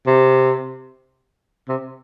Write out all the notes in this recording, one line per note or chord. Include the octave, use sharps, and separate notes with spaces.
C3
C3